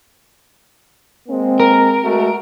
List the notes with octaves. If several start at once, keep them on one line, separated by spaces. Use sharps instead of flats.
G#3 A#3 C4
A#4
G#3 A3 F#4